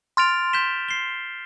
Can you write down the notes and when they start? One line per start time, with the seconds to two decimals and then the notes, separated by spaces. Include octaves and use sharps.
0.17 C6 F6 A6 D7 F7
0.53 G6 B6 E7 G7
0.88 C7 G7